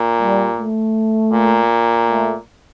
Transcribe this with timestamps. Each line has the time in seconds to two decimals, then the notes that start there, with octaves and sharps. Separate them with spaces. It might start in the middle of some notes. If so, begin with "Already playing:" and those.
Already playing: A#2
0.21 G3
0.58 A3
1.33 A#2
2.08 A3